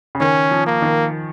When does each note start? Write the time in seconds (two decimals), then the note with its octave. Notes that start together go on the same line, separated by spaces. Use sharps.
0.15 C#3
0.20 D#3 C#4
0.51 F3
0.66 A#3
0.82 D#3